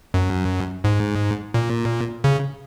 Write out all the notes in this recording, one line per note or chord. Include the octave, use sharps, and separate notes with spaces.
F#2
G#2
A#2
C#3